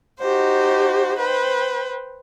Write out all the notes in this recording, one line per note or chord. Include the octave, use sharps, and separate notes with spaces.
D#4 F#4 G4 C5
B4 C5 G5